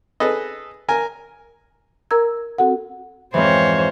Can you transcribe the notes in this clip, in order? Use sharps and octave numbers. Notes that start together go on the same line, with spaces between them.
G#4 A4 B4 D#5
A#4 G#5
A#4 A#5 E6 G#6
C4 F#4 A4 F#5
F2 G#2 E3 C5 C#5